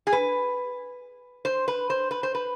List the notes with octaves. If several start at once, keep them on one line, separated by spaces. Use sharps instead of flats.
G#4
B4
C5
B4
C5
B4
C5
B4